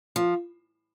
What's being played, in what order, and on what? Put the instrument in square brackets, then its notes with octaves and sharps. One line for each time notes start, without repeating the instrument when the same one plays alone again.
[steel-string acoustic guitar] F3